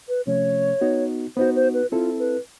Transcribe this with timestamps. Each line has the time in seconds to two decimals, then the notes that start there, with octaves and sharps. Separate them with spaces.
0.09 B4
0.27 C3 F3 A3 C#4 C#5
0.81 B3 D#4 F#4
1.37 B3 D#4 F#4 C5
1.55 C5
1.74 B4
1.91 C4 E4 F4 A4
2.19 B4